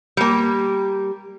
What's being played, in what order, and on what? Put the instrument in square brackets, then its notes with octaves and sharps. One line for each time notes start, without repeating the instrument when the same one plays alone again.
[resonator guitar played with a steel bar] G3 A#3